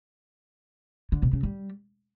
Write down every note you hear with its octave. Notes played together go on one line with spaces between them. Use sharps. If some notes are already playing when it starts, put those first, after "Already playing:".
D3
B2
C#3
G3